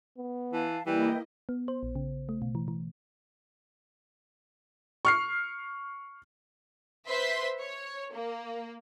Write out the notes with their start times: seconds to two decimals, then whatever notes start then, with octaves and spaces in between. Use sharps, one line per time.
0.18 B3
0.53 E3 F5 A5
0.86 E3 G3 A#3 E4 B4 D#5 G5
1.49 B3
1.68 C5
1.83 A#1
1.95 C#3
2.29 A3
2.42 B2
2.55 E3
2.68 E3
5.05 C#6 F6 C7
7.08 B4 C5 E5 C6 B6
7.60 C#5
8.14 A#3